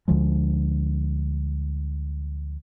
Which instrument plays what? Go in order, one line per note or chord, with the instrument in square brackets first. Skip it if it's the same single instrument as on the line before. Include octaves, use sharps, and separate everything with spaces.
[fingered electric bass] D2 D3 F3 G#3